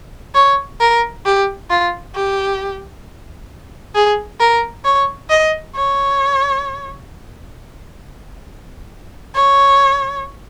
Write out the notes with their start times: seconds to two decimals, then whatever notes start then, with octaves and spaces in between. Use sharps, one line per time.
0.35 C#5
0.80 A#4
1.26 G4
1.70 F4
2.15 G4
3.95 G#4
4.40 A#4
4.85 C#5
5.30 D#5
5.75 C#5
9.35 C#5